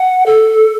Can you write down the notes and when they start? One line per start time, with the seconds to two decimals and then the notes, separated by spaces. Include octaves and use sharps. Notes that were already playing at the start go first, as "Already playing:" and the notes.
Already playing: F#5
0.26 A4